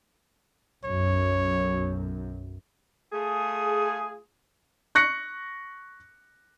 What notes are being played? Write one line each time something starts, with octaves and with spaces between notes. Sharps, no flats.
B1 F#2 C#5
A3 F4 G#4
C#6 F#6 A#6 C#7